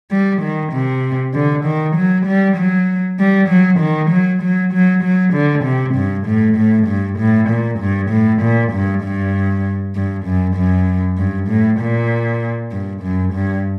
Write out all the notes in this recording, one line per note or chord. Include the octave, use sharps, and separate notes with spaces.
G3
D#3
C3
D3
D#3
F#3
G3
F#3
G3
F#3
D#3
F#3
F#3
F#3
F#3
D3
C3
G2
A2
A2
G2
A2
A#2
G2
A2
A#2
G2
G2
G2
F#2
F#2
G2
A2
A#2
G2
F#2
G2